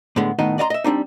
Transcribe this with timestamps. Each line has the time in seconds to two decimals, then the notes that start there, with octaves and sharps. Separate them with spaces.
0.16 A2 D3 G#3 B3
0.39 A2 D#3 B3 D#4 D#5
0.58 D5 D#5 F5 A#5 C6
0.70 D#5 E5
0.84 G3 C4 D4 D#4